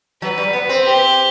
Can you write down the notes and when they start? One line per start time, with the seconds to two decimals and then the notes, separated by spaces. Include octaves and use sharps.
0.22 F#3 B4
0.38 G3
0.53 B3
0.69 C4
0.84 G4